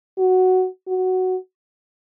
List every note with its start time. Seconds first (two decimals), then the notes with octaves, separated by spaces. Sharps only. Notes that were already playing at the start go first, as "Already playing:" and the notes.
0.18 F#4
0.88 F#4